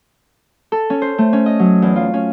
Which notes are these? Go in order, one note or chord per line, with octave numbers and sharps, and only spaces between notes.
A4
C#4
C5
A3
C#4
D#5
F#3
E2
F4
C#4